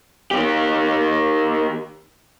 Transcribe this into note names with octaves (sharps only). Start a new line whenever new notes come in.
D#3 G4